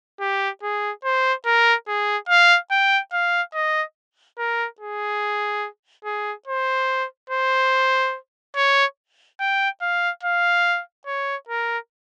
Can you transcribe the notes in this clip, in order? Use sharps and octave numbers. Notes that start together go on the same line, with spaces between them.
G4
G#4
C5
A#4
G#4
F5
G5
F5
D#5
A#4
G#4
G#4
C5
C5
C#5
G5
F5
F5
C#5
A#4